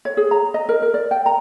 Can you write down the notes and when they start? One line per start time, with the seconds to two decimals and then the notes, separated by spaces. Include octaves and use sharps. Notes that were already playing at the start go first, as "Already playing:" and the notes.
0.05 C#5
0.17 G#4
0.31 A#5
0.54 D#5
0.69 A#4
0.82 A#4
0.94 D5
1.11 G5
1.26 A#5